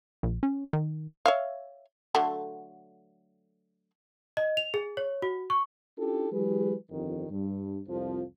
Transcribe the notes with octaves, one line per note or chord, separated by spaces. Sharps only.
A#1
C#4
D#3
C#5 E5 F5
D3 F#3 A3
D#5
F7
G#4
C#5
F#4
C#6
C#4 D4 E4 F4 G4 A4
E3 F#3 G#3 G4 G#4 B4
G1 F2 D#3
G2
C2 F2 F3